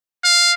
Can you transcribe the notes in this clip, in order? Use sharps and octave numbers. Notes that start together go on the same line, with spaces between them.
F5